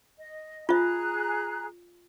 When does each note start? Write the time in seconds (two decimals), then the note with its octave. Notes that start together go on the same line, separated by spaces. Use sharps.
0.19 D#5
0.69 F4 G#4 E5 A#5 F#6